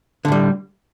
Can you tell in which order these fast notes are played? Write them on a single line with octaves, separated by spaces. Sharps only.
D3 A2 G3